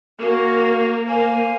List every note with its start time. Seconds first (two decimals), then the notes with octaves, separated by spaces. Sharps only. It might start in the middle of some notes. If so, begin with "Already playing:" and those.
0.20 A#3 C#4 F#4 A#4 F5
1.06 A#3 C5 F5 G#5